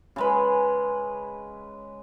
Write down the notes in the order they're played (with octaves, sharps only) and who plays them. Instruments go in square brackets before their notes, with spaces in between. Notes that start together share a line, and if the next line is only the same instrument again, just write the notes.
[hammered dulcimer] C#3 G#3 B4